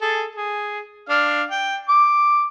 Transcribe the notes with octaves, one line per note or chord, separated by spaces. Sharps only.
G#4 A4
G#4
D4 F5 F6
G5
D6